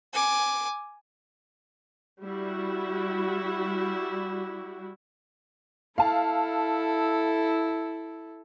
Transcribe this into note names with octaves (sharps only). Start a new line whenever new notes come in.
G#5 D6
G3 E4 F#4
E4 A4 F5 A5